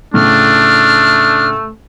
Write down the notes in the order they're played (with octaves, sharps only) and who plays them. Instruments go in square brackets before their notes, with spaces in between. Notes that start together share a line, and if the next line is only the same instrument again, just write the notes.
[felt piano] A2 C#3 [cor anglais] A3 [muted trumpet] D4 [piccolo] F6